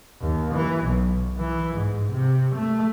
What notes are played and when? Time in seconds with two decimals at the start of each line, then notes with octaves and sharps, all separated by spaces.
0.21 D#2
0.54 E3
0.84 B1
1.38 E3
1.76 G#2
2.12 C3
2.54 A3